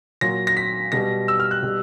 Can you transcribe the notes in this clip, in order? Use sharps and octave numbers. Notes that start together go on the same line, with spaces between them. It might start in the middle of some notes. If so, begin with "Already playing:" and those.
A#2 F#3 A#6
A#6
B6
B2 G3 A#6
E6
F6
F#6
B2 G3